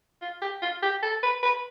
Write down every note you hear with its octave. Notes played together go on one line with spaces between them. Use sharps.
F4
G4
F4
G4
A4
B4
B4